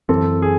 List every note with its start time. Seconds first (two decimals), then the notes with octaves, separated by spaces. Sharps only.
0.09 F#2 E3 C4 A4
0.42 G#4